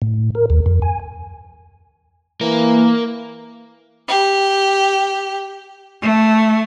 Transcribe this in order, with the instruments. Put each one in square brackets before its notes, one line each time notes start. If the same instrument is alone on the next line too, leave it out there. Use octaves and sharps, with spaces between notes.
[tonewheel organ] A2
A#4
D#2
F2
G#5
[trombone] E3 [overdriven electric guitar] A#3 A#4
[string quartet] G4
A3